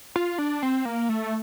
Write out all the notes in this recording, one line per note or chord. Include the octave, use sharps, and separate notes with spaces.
F4
D4
C4
A#3
A3